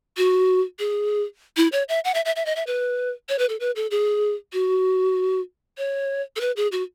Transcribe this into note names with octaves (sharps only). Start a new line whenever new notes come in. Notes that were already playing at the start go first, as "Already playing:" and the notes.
F#4
G#4
E4
C#5
E5
F#5
E5
E5
E5
D#5
E5
B4
C#5
B4
A4
B4
A4
G#4
F#4
C#5
A4
B4
G#4
F#4